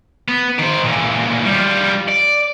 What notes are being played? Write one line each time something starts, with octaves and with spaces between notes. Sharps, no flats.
B3
D#3 C5
A#2 E3
G3 F4
D5